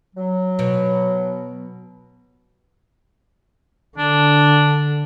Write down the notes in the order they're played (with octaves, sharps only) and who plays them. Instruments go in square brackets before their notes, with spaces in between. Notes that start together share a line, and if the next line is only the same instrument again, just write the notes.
[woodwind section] F#3
[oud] B2
[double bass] D3 [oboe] D4